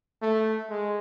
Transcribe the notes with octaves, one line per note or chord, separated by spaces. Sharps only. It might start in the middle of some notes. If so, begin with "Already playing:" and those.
A3
G#3